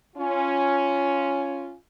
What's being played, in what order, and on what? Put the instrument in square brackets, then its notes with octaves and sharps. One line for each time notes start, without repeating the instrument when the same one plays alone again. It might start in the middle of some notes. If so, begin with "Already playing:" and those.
[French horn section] C#4 F4